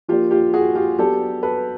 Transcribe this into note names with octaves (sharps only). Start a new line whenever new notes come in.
F3 A#3 D4 F4 G4
F4 G4
F#4 G#4
F4 G4
F#3 B3 D4 G4 A4
A4 B4